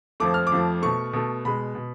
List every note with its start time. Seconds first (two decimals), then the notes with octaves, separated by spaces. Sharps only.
0.20 F2 F3 A3 D6
0.34 F6
0.47 D6
0.52 F2 F3 A3
0.82 B2 A3 C#6
1.13 B2 A3
1.45 B2 G#3 B5
1.75 B2